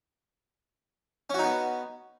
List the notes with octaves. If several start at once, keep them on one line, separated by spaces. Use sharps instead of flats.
B3 C#4 D#4 F#4